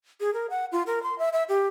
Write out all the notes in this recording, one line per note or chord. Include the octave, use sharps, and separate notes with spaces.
G#4
A#4
F#5
F4
A#4
C6
E5
E5
G4